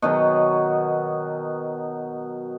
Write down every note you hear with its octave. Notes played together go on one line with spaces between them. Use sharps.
B2 D#3 F#3